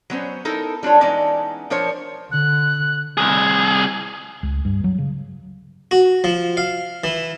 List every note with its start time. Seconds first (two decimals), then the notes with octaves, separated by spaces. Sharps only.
0.10 F#3 B3 C#4 C5
0.45 D#4 E4 A4 A#4
0.83 G3 D4 F4 C#5
1.01 E3 G#3 B3 C#4 D#4 D5
1.70 F3 D4 A#4 C5 C#5
2.32 D3 F#6
3.17 C2 G#4
4.43 C#2
4.65 G2
4.84 F#3
4.98 C#3
5.91 F#4
6.24 F3
6.57 F5
7.04 E3